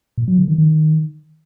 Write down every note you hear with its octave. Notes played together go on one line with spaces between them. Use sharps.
A#2
F#3
D3
D#3
D#3